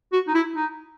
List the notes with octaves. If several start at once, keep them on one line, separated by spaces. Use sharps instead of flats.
F#4
D#4
E4
D#4